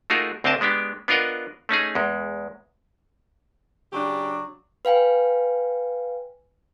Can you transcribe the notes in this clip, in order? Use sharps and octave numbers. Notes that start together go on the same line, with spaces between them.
A3 D#4 F4 F#4 G#4 A#4
D2 C4 D4 A#4 D#5 A5
G#3 B3 D4 G4
B3 D4 F4 A#4 D#5 F#5
A3 C#4 D#4 G#4
E2 G#3
C#3 F#3 D4 G4
B4 F5 G5 G#5